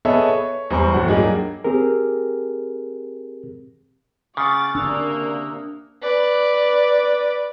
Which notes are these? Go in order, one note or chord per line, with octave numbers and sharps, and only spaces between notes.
B3 G#4 A4 C#5 D#5 E5
C#5
E2 G3 C5 A#5 C#6
D1 G2 F#3 F#5
F#3 A#3 D4 D#4 G4 G#4
C4 G4 G#4 A#4
C#3 F#5 D6 D#6 F6 A6 C#7
C3 A#3 D4 E6 F#6 C#7
B4 D5